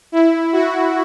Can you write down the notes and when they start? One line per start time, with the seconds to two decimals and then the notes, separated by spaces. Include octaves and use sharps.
0.12 E4
0.53 F#4